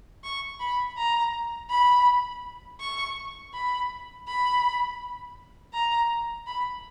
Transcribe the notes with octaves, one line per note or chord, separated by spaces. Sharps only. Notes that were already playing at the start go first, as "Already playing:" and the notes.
C#6
B5
A#5
B5
C#6
B5
B5
A#5
B5